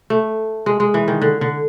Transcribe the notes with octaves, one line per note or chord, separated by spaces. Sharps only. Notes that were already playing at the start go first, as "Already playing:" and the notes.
A3
G#3
G#3
E3
D#3
D3
D3